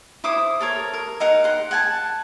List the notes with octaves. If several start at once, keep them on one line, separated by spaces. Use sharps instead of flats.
E4 C5 D6 D#6
A4 A#4 C#5
A#4
D#4 A#4 F#5
F#5 C6
F#5 G#5 A5